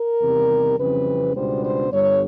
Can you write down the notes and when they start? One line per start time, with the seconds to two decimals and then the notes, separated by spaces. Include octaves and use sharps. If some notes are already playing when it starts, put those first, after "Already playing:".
Already playing: A#4
0.21 E2 C3 D#3 G3
0.77 F2 C#3 E3 G3 C4 B4
1.34 C#2 B2 G3 B3 D4 C5
1.62 C5
1.90 G1 G2 D3 G3 C#5